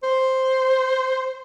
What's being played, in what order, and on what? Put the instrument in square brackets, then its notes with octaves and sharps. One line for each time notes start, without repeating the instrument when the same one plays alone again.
[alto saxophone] C5